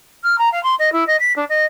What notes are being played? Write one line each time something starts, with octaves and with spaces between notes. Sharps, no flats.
F6
A#5
F5
C6
D#5
E4
D#5
B6
D4
D#5